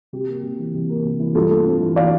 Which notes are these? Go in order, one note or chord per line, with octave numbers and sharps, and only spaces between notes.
C3 G4
A#3
C3
E3
C3
A#3
C3
E3
G2 F4 A4
A3
C4
E3
D5 F5